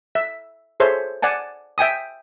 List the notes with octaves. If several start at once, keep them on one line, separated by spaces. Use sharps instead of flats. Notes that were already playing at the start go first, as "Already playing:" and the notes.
E5
G#4 A4 C5 C#5 E5
D5 F#5 G#5 A5
E5 G5 G#5 D#6